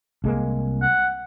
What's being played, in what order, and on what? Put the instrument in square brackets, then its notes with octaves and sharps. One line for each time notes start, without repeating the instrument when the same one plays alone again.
[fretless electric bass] C2 G#3 A#3
[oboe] F#5